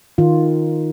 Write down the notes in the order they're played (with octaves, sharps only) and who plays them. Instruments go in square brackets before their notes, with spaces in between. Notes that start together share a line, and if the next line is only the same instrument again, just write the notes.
[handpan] D#3 F4